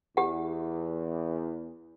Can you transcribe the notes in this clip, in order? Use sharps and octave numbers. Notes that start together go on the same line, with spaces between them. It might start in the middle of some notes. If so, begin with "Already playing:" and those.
E2 G4 F#5